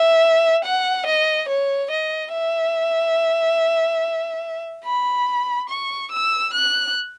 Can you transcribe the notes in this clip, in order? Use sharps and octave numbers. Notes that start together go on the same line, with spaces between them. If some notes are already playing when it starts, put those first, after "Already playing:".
Already playing: E5
F#5
D#5
C#5
D#5
E5
B5
C#6
E6
F#6